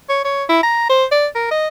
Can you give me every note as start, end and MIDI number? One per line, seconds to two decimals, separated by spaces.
0.10 0.21 73
0.25 0.44 73
0.49 0.62 64
0.63 0.85 82
0.90 1.05 72
1.12 1.27 74
1.35 1.47 70
1.51 1.68 75